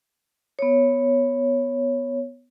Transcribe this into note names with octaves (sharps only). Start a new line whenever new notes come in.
B3 C#5